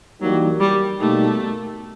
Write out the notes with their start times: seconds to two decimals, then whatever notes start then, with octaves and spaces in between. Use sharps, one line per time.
0.21 E3 F#3 G3 A#3 D#4 G4
0.60 G3
1.00 B2 G3 A3 A#3 D#4 G4